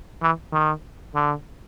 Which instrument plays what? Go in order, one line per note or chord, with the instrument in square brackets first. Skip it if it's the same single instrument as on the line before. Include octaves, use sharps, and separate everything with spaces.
[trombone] E3
D#3
D3